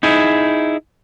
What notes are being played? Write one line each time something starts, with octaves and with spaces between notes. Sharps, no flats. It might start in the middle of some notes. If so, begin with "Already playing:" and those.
D#4 E4 G#4